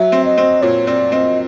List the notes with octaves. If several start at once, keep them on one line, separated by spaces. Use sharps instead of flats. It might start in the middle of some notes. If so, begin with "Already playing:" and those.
Already playing: F#3 E5
C4
D#5
C4
A#2 C#5
C4 D5
C4 D#5